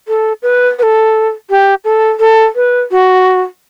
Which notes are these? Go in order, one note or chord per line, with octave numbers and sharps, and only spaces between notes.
A4
B4
B4
A4
G4
A4
A4
B4
F#4